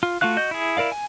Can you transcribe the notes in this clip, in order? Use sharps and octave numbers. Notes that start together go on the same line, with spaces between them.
F4
A3 F4 F#4 F5 F#6
F#4 D#5 G6
E4 G#4
E4 A#4 D5 F5
G#5